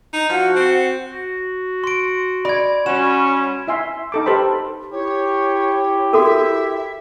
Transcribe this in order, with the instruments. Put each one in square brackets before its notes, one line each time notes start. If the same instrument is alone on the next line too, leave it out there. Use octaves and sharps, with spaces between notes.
[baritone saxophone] D#4
[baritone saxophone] F3 [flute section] F#4 F#5
[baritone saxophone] C4
[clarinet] F#4
[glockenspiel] C6 D7
[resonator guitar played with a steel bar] D5 [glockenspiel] B5 G#6
[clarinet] G3 [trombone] C#4 [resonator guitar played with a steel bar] F#4 [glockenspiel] E7
[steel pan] E4 E5 G#5 C6
D#4 A4 D6
G4 A4 B4 C5 B5
[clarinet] E4 [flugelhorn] G4 [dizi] C#5
[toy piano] F#4 A4 A#4 [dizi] E5